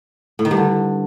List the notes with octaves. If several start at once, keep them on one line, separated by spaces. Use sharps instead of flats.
A2
D#3
G2
D3